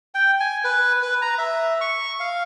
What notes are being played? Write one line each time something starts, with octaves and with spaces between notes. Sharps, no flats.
G5
G#5
B4
B4
A#5
E5
C#6
F5